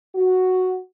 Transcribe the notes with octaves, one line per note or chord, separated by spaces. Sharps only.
F#4